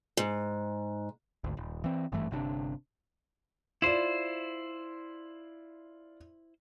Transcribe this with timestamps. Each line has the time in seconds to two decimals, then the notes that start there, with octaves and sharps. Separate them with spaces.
0.17 G#2
1.44 G#1 D2
1.57 D#1
1.84 E3 C4
2.12 G#1 G2 E3 A3
2.31 G1 C3 C#4 D4
3.82 E4 F4 C5 D5